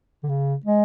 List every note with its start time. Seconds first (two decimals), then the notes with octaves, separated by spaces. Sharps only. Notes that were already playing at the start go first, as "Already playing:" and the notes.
0.23 D3
0.29 C#3
0.66 G#3